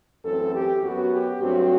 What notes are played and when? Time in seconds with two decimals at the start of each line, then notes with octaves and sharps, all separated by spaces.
0.24 F#2 E3 A3 C4 A4
0.53 G4
0.82 F#2 F#3 B3 F#4
1.12 G4
1.41 G2 F#3 A3 C4 F#4